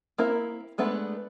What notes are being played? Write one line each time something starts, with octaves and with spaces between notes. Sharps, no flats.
A#3 C4 E4 A#4
G#3 A3 B3 D4 B4